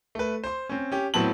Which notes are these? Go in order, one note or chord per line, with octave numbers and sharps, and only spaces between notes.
A3 B4
C5 C6
C4 C#4
C#4 G4
A2 F#3 B3 C4 A5 F#7